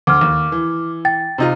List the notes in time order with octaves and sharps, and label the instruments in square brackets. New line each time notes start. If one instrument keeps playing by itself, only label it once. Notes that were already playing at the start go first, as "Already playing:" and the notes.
[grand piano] D2 [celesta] D6 F6
[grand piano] D#2
E3
[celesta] G5 A6
[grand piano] C3 D#4 F4